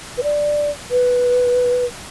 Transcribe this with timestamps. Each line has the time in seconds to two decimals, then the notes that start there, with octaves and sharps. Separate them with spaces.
0.18 B4
0.23 D5
0.91 B4